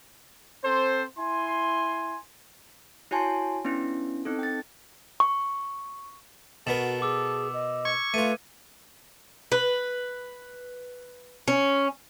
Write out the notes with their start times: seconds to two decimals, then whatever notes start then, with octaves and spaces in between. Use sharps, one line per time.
0.64 C4 A4 C5
1.19 E4 G#5 C6
3.11 E4 F#4 C#5 G#5 A5 C6
3.65 B3 C#4 D4 E4
4.25 C4 D#4 A4
4.39 G5 A6
5.20 C#6
6.67 B2 B3 F#4 A4 A#4 E7
7.02 G#4 D6 E6
7.53 D#5
7.85 C#6 G#6
8.14 A3 F4 B4 D#7
9.52 B4
11.48 C#4